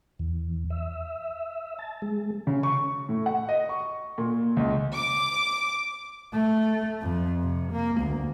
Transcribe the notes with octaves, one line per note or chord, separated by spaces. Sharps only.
E2
E5
A5
G#3
C#3
C#6
A2
F#5
D#5
C#6
A#2
C#2
D6
A3
F2
C3
A#3
D2